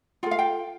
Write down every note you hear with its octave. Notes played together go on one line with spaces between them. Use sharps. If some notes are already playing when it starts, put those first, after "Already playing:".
F4 A4 G5
F5
G5